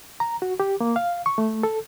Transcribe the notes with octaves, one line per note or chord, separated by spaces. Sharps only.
A#5
F#4
G4
A#3
F5
C#6
A3
A4